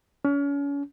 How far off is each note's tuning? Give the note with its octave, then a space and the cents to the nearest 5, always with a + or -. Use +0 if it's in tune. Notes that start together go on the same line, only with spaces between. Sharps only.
C#4 +35